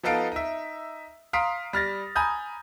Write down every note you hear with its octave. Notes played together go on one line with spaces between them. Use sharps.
F3 B3 D#4 A4 F5 D7
D#4 E5
F5 A#5 C6 D#6 B6 D7
G3 F6 A6 A#6
G#5 A#5 B5 D#6 G6